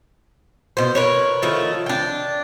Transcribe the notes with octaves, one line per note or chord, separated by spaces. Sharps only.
B2 C5
A#4 B4 C#5
D#3 F3 A3 C#5
D4 G5